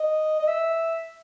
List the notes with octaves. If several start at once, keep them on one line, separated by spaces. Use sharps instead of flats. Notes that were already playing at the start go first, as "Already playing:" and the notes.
Already playing: D#5
D#5
E5